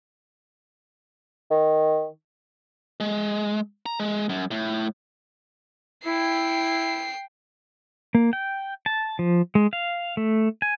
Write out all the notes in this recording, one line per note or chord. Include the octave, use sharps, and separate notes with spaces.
D#3
G#3
A#5
G#3
F#2
A2
E4 G5 C7
A#3
G5
A5
F3
G#3
F5
A3
G#5